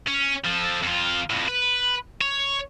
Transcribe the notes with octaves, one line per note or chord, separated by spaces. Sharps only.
C#4
F3 A4
F2 F4
F2 A2
B4
C#5